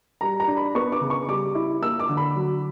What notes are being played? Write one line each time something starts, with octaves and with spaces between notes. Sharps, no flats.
G3 A#5
A#5
D4
B5
B3 C#6
D6
C#3
C#6
G3 D6
E4
A#3 E6
D6
D3
B5
F#3